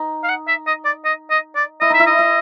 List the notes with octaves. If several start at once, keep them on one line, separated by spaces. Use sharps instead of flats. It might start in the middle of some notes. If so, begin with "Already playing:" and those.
Already playing: D#4
F5
F#5
E5
D#5
D5
D#5
D#5
D5
E4 D#5
D#4 E5
E4
D#5
E4